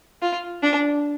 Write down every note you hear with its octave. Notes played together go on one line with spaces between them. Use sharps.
F4
D4